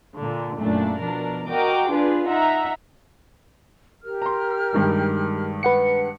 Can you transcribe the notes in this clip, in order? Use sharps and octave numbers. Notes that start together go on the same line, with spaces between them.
A#2 D3
F#2 A#2 A3 D4
B2 F3 D4 A#4
F#4 A#4 D#5 G5 D6
D4 F4 G#4 B4
D#4 E5 F#5 A#5
G4 A#4 F6
A#5 C6
G2 D#3 G#3
B4 F#5 C#7